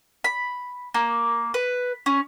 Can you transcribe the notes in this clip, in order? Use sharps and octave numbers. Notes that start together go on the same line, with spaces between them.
B5
A#3
B4
C#4